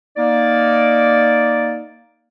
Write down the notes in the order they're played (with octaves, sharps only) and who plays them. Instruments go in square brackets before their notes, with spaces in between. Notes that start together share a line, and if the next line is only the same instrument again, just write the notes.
[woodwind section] A#3 D#4 D5